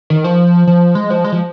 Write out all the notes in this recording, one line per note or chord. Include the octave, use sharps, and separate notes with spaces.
D#3
F3
F3
G#3
F3
G#3
F3